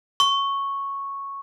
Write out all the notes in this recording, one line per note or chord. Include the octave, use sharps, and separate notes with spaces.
C#6